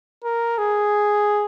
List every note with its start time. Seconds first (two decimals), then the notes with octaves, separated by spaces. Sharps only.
0.24 A#4
0.58 G#4